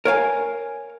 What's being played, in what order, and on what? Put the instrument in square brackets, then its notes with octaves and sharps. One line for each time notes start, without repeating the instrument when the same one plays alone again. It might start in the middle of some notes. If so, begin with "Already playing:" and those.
[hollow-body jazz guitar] A#4 C#5 F5 G#5